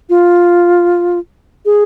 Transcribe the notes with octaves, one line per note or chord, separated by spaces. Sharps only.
F4
G#4